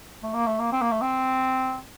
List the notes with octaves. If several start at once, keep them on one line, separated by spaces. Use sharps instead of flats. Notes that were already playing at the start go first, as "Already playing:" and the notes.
A3
A#3
A3
A#3
C4
A#3
A3
C4